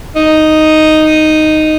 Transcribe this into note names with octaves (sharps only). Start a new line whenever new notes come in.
D#4